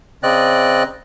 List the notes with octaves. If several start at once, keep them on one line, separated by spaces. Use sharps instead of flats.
C#3 C4 D5 D#5 F#6